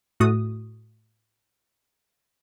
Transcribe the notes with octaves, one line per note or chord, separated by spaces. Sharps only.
A2 A3 F#4 D#6